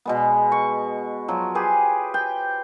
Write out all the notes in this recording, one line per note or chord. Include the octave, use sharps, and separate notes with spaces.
B2 G#3 B3
C#6
F3 F#3
G4 G#4 B4 C5
G5